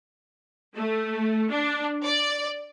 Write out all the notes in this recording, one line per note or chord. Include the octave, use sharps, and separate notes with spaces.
A3
D4
D5